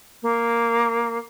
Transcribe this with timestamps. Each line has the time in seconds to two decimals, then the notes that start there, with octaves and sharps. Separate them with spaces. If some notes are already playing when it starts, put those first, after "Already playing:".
0.22 A#3